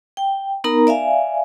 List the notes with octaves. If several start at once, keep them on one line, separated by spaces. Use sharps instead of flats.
G5
B3 D#4 A#4 A#5
D5 E5 F5 G#5